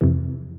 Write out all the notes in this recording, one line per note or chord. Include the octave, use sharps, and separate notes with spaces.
F2 C3 E3